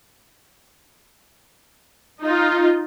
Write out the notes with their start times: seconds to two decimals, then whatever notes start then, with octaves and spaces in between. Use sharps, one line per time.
2.21 D#4 F4